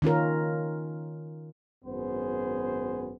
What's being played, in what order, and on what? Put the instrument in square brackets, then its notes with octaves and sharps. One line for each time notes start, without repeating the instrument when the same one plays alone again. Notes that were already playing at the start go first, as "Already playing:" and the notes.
[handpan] D#3 C#4 F4 A#4
[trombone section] G#1 F#2 B3 G#4 C5